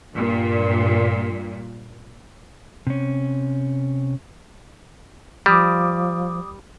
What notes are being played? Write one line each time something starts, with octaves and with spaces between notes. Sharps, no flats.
G2 A#2
C3 C#4
F3 G3 D6 D#6